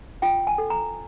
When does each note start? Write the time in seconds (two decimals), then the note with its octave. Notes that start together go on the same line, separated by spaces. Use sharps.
0.22 F4 G5
0.47 G#5
0.58 A4
0.70 A#5